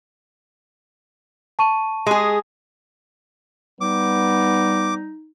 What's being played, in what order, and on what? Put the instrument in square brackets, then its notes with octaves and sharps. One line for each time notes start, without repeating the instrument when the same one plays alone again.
[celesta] A5 C#6 D#7
[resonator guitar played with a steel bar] G#3 G#4
[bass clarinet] G3 [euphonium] B3 [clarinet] D#4 [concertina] D6